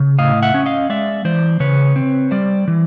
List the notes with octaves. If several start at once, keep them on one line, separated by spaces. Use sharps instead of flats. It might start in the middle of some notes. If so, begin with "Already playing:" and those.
Already playing: C#3
A2 D#5 F5
E5 F#5
C#4
D#5 F5
G#3 D5 E5
E3 C5 D5
C#3 B4 C#5
C4
G3 C5 D5
E3